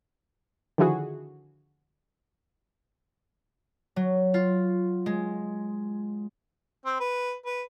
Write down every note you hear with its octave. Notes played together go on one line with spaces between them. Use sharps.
D3 D#3 F3 E4 F#4 G#4
F#3
F4
G#3
C4
B4
B4